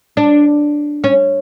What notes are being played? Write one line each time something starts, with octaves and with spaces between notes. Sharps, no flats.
D4
C#4